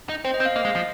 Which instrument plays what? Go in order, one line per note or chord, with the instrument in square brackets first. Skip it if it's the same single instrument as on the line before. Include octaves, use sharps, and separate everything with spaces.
[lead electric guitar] D#4
[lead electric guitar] C4 [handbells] C5
[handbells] D#5
[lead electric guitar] C4
[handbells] F5
[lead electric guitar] A#3 [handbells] D#5
[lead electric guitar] G#3
F3